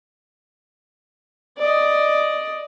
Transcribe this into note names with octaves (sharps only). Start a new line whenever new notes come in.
D5 D#5